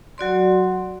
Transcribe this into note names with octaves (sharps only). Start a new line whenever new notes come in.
F#3 F#4 D5 C6